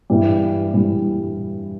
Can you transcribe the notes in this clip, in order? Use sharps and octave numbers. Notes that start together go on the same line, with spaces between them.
G2 E3 G3
G2 E3 G3